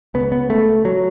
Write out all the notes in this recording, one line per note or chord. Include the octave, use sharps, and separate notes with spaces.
C#2 C#3 B3
B3
A3
F#3